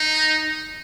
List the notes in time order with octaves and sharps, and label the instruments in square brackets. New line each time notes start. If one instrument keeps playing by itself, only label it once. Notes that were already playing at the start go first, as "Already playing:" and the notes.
Already playing: [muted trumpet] D#4